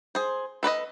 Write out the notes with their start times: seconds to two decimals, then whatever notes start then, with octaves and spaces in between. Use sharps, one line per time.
0.15 G#4 C5
0.63 A4 B4 D5 D#5